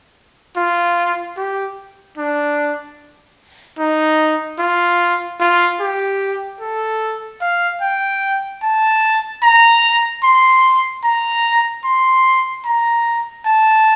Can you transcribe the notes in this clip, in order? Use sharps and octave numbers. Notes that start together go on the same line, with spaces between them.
F4
G4
D4
D#4
F4
F4
G4
A4
F5
G5
A5
A#5
C6
A#5
C6
A#5
A5